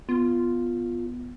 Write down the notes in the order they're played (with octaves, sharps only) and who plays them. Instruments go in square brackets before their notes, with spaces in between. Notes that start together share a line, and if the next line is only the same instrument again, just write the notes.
[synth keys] B3 [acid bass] F4